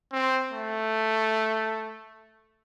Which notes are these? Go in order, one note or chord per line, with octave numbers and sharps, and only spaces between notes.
C4
A3